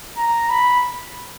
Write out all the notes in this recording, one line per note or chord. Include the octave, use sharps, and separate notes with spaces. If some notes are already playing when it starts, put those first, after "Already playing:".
A#5
B5